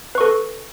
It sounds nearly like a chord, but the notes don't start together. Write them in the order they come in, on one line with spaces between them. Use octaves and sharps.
B4 C#6 A4